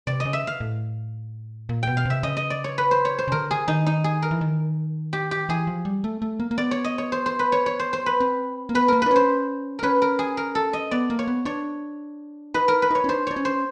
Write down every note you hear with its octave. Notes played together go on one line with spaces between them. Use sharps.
C3 D5
D#5
C#3
E5
F5
A2
A#2
B2 G5
F5
C3 E5
C#3 D#5
D#5
D5
C#5
B4
C5
C#5
C5
C#3
D3 A#4
G#4
D#3 D#4
D#4
G#4
A#4
E3
D#3
G4
G4
E3 G#4
F3
G3
A3
A3
A#3
A#3
B3 D5
C#5
D#5
C#5
C5
C5
B4
C#5
C#5
C5
C5
B4
C4
A#3
B3 B4
A#3 A#4
D4 B4
C#4 C5
C#4 A#4 B4
A#4
G#4
A#4
A4
D#5
B3 D5
A#3
C#5
B3
D4 C#5
D#4 B4
A#4
B4
D#4 C#5
C#4
D4 C5
D4 C#5
C#4
C5